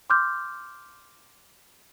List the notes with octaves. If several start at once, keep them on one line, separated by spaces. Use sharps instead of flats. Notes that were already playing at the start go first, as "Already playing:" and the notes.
C6 D6 F6 G6